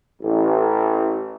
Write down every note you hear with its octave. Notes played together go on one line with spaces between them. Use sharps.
A1